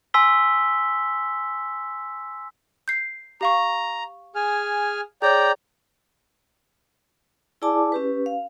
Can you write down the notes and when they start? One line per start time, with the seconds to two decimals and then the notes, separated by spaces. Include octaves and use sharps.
0.14 G#5 C6 E6 B6 G7
2.88 G6 C7
3.41 G4 F5 A#5 C#6
4.35 G#4 G#5 F6
5.22 G#4 C#5 D5 G5 A#5 G6
7.62 E4 G#4 D5 G#5 A5 D6
7.92 C#4 G4 B4
8.26 F5